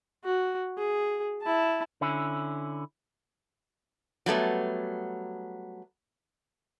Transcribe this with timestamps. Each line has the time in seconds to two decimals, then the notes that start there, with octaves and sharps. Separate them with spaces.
0.24 F#4
0.78 G#4
1.42 E4 A5
2.01 D3 C#4 E4
4.26 F#3 G3 A3 B3